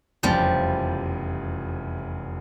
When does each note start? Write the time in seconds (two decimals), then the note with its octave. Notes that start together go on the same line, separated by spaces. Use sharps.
0.23 F1 E2 C#3 F3 G3